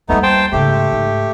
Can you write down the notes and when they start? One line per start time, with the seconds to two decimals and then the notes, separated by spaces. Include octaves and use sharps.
0.09 D#2 G3 A3 B3 D#4
0.23 C5 G5 A5
0.52 G#2 C#3 A3 G4
0.92 G#2